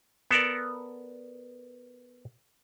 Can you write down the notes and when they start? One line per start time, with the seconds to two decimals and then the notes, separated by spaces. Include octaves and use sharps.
0.31 B3 A4 A#4 D5